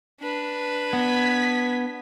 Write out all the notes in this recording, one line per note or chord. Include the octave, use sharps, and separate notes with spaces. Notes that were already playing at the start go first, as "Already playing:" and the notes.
D4 B4
B3 G#6 B6